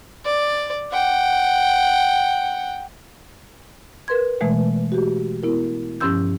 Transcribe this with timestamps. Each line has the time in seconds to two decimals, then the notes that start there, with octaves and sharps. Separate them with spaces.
0.26 D5
0.92 F#5 G5
4.08 A#4 B4 C6 G#6
4.41 B2 E3 G#3 A3
4.92 F#4 G4
5.43 B3 E4 A#4
6.00 G2 F3 C#4 C6 E6 G6